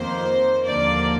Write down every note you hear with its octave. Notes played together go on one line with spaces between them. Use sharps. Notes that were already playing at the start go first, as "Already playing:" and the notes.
Already playing: F2 D#3 A#3 C5
D#2 D3 F3 A#3 D5